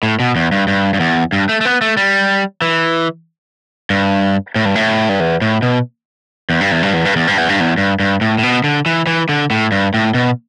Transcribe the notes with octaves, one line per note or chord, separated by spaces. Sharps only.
A2
B2
E2
G2
G2
G2
E2
G2
A3
A3
B3
A3
G3
E3
G2
A2
G2
A2
G2
E2
A2
B2
E2
G2
E2
G2
E2
G2
E2
G2
E2
G2
E2
G2
G2
A2
A2
B2
D3
E3
E3
D3
A2
G2
A2
B2